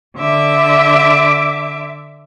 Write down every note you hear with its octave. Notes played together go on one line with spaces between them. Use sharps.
D3 E5 D6